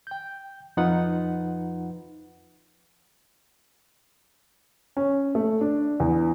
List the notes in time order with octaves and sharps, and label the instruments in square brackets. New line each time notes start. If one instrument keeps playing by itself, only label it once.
[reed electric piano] G5 G6
F2 F3 D#4 F4 B4 F#5
[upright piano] C#4
A3
D4
E2